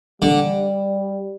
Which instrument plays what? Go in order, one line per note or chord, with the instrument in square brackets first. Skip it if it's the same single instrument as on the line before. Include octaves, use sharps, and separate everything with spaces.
[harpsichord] D3 [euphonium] G3